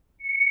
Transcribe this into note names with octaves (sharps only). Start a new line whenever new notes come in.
C#7